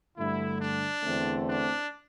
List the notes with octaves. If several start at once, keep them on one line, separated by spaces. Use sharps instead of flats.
G2 D3 A3 E4
D4
E2 D3 A3 C4
D4